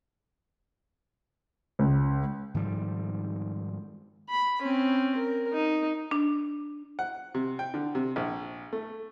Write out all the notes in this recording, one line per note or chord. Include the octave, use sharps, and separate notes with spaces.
C#2
G#2 D#3 F3 G3
B5
C4 C#4
A#4
D#4
D4
F#5
C3
G5
D3
C3
A#1
A3